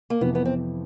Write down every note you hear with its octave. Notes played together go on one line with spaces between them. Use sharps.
A#3
F2 C3 E3 B3
B3
C4